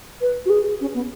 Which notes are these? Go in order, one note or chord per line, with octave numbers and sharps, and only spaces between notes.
B4
F#4
G#4
C#4
B3